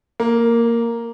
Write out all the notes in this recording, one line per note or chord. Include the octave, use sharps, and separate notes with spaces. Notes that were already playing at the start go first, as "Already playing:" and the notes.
A#3